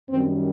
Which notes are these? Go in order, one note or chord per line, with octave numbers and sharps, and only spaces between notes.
F#2 D#3 G3 C4